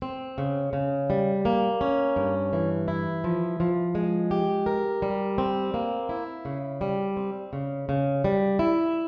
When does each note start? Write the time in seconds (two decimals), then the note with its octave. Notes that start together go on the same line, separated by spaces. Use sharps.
0.02 C4
0.38 C#3
0.73 C#3
1.10 G3
1.45 A#3
1.81 C#4
2.16 G2
2.53 E3
2.88 E4
3.24 F3
3.60 F3
3.95 G#3
4.31 G4
4.66 A#4
5.02 G3
5.38 C4
5.74 A#3
6.09 E4
6.45 C#3
6.81 G3
7.17 C4
7.53 C#3
7.89 C#3
8.24 G3
8.59 E4